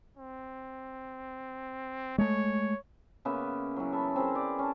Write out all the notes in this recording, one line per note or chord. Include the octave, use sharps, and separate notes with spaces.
C4
G#3 A3 C#5
C#3 A#3 B3 E5
E3 F#3
E5 A5 B5
C4 G#4 A#4 B4
D5
C#4 A5